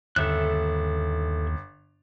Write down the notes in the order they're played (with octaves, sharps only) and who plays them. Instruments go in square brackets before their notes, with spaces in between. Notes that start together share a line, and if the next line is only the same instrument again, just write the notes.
[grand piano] G1 [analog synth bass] D#2 [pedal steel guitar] A4 E5 F#6